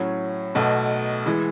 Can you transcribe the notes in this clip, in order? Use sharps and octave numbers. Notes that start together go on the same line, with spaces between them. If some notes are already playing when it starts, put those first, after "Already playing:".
Already playing: A2 F#3 C#4
B1 B2 A3
E3 G#3